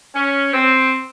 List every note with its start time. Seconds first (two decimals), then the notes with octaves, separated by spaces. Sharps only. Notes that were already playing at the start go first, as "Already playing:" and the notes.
0.15 C#4
0.53 C4